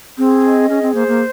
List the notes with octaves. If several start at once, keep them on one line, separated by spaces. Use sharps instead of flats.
C4 G#4
D#5
C#4 G#4
C4
A#3 C5
A#3